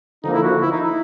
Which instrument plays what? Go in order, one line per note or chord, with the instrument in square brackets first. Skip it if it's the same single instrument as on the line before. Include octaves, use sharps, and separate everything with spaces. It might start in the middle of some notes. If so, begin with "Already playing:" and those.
[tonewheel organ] D3 F3 A#3 [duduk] D#4
[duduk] E4
F#4
E4
D#4
E4